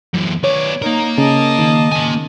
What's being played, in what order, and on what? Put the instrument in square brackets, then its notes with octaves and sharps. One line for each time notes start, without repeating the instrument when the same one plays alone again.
[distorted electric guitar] F#2 E3
[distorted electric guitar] B3 D5 [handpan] C#5
[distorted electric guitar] A#3 A#4 [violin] D#4
[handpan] C#3 C#4 [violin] D#5 A5
[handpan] D#3
[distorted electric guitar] A#3 G#5